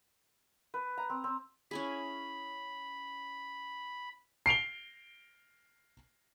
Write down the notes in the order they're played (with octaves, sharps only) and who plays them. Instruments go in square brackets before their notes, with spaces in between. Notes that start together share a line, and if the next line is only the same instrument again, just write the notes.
[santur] B4
A#5
C4
C4
[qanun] C#4 E4 G#4 [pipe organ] B5
[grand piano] C7 D7 F7 G7